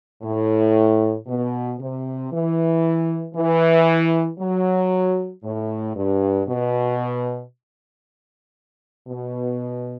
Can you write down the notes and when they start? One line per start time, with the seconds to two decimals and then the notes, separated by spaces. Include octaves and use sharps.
0.23 A2
1.27 B2
1.80 C3
2.32 E3
3.35 E3
4.39 F#3
5.44 A2
5.96 G2
6.48 B2
9.08 B2